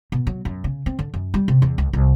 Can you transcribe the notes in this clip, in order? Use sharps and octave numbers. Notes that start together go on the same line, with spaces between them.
B2
F#3
F#2
C#3
C4
D3
F#2
G3
C3
E2
C#2
C2